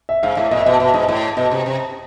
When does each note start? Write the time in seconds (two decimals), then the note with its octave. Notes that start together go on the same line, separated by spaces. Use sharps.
0.09 E5
0.23 G#2 F5
0.37 A2 E5
0.51 A#2 D#5
0.59 E5
0.66 B2 D#5
0.80 B2 E5
0.94 G#2 D#5
1.09 A2
1.37 B2 D#5
1.51 C3
1.66 C3